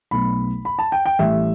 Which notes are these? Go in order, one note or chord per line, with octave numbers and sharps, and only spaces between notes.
B1 B2 A3 B5
B5
A5
G5
G5
A1 A2 G3 E5